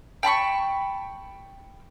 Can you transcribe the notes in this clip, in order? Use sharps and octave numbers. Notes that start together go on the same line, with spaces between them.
G5 A5 B5 C#6